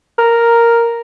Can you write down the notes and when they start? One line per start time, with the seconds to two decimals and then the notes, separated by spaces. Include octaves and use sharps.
0.18 A#4